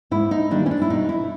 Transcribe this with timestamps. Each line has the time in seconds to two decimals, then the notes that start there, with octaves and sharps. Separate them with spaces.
0.11 G#2 E4
0.31 D#4
0.51 D#3 G3 A#3 D4
0.66 C#4
0.71 D4
0.82 E4
0.90 B2 D#4
1.09 E4